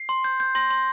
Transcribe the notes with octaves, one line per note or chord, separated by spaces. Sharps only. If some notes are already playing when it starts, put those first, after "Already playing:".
Already playing: C7
C6
G6
G6
C6 A#6
C6